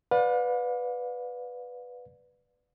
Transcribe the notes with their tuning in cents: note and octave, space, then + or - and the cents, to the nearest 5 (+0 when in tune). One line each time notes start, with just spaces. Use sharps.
B4 +0 D5 +0 F5 +45